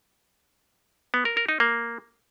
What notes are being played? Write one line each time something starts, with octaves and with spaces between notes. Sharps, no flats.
B3
A#4
A#4
D#4
A#3